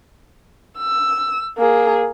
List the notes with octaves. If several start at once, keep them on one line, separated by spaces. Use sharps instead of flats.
E6
A#3 G#4